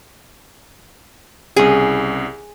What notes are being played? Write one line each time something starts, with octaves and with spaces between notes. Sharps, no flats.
C2 C#3 G#4